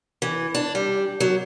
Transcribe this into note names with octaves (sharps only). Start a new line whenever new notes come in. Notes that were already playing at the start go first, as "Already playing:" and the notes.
E3
D4
G3
F#3